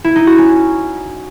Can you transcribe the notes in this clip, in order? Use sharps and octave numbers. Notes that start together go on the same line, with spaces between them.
E4
D#4
F#4
C#4